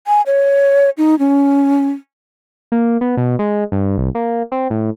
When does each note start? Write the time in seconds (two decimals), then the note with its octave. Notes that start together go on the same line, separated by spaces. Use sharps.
0.07 G#5
0.26 C#5
0.98 D#4
1.19 C#4
2.72 A#3
3.01 B3
3.17 B2
3.39 G#3
3.72 G2
3.98 C2
4.15 A#3
4.52 C4
4.70 A2